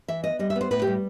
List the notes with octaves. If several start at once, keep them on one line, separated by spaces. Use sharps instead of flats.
E3 E5
B3 D#5
G3 D#5
E5
B3
C5
A2 B4
G4
G3